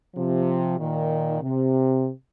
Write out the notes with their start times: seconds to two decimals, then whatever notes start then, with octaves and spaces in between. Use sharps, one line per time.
0.15 C3 F3
0.79 A#2 D#3
1.42 C3